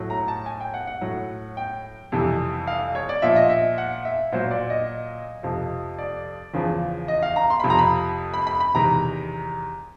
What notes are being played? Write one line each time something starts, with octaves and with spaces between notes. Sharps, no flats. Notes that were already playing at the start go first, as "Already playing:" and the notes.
Already playing: A2 F#3
A#5
A5
G#5
G5
F#5
F#5
A2 F#3
G5
F2 C3 E3 G3
F5
C#5
D5
A#2 F3 E5
D#5
E5
F#5
E5
A#2 F#3 C5
D5
D#5
F2 C3 F3
D5
E2 C#3 F3
D#5
F5
A#5
C6
F2 C3 F3 B5
A#5
B5
B5
B5
B5
E2 C3 D#3 A#5